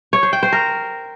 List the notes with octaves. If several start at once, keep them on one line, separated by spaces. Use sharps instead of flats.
C#5
C5
G5
C5
A#4